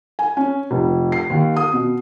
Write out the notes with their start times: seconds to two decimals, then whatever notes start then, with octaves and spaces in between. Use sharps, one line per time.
0.19 G#5
0.37 C#4
0.71 F1
1.12 C7
1.30 D#2
1.56 D#6
1.73 B2